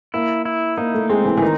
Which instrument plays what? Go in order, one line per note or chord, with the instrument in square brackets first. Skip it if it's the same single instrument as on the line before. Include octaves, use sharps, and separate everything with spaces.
[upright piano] A#3 [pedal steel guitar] E4
[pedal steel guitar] E4
[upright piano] A#3 [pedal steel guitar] D#4
[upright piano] A3
[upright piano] G#3 [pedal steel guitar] C4
[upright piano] E3
E3
[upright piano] D#3 [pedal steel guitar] D#4